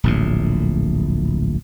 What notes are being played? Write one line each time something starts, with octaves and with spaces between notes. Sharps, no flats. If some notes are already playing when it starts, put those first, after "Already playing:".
D1 A#1 A2